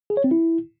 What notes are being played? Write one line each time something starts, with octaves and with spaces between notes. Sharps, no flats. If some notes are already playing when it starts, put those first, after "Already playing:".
G#4
C#5
C4
E4